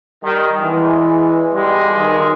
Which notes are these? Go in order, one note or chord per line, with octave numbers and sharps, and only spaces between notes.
D#3 G3
E2 E3 G#3
B1 G3 G#3
D#3